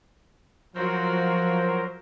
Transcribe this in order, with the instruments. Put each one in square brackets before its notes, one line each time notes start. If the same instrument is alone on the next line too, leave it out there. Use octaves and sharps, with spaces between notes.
[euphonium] F3 [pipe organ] F#3 A#4 C5 [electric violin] F4 F#4